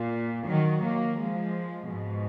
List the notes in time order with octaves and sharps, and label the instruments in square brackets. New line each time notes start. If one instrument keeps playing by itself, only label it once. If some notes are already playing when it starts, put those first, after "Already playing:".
Already playing: [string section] A#2
D#3 F#3
F#3 A#3
F3 G#3
G#2 B2